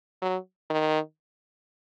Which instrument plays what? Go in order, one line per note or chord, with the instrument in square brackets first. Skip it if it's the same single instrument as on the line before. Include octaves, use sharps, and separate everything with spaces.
[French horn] F#3
D#3